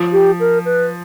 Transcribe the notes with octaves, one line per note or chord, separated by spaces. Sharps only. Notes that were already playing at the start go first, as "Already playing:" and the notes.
Already playing: F3
G4
A#4
B4